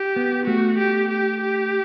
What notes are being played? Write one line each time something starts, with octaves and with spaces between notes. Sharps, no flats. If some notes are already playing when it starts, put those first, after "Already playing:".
Already playing: G4
B3
A3 F#4
G4
G4
G4